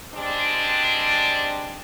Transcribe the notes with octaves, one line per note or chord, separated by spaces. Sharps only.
G3 G#3 C4 D4